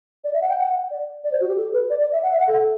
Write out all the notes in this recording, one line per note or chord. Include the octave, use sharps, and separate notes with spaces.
D5
E5
F#5
G5
F#5
D5
D5
C5
F#4
G4
A4
B4
D5
D5
E5
F#5
E5
F#5
A4